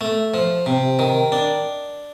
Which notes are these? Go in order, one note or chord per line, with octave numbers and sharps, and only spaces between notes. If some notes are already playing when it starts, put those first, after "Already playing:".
A3
F3
C3
D#3
D4